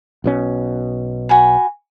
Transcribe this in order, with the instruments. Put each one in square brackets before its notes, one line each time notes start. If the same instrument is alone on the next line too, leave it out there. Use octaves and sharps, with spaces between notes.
[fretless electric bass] B1 B2 C#4
[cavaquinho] F#4 G#5 B5